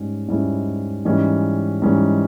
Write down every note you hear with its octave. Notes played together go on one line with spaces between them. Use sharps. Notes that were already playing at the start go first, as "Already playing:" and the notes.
Already playing: G#2 G3 C#4
G#2 G3 C#4 E4
G#2 E3 G3 C#4
G#2 E3 G3 C#4